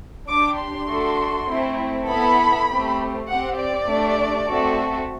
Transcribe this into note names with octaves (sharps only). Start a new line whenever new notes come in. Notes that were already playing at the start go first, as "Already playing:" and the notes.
D4 G4 D6
C6
A3 D4 F#4 A4
A3 C4 E4
B3 E4 A4 B5
A3 C4 G4
C4 G4 F#5
D5
A3 D4 G4
A3 C4 F#4 A4